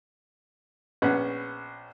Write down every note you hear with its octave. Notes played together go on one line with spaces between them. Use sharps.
A#1 B3 C#4 F#5